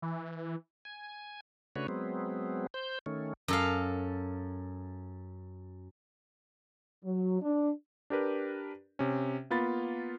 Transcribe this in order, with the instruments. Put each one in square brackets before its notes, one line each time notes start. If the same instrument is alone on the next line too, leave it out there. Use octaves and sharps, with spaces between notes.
[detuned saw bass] E3
[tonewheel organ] G#5
C#3 A3 D4 F#4 B4 C#5
F#3 G#3 B3 C4
C5 G6
D#3 A3 C#4
[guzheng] F#2 A4 F5
[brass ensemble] F#3
D4
[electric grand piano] D4 G4 A#4 B4
C3 C#4
A#3 B3 F4 B5 A6